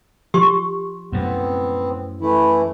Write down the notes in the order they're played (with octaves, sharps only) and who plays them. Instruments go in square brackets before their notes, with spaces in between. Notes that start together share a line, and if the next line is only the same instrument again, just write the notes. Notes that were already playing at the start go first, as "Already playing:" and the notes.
[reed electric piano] F3 [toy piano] G4 C6 C#6
[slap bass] F#2 A2 [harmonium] B3 C4
[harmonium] E3 A3 E4